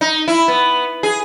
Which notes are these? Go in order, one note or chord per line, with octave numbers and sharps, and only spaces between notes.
D#4
E4
B3
G#4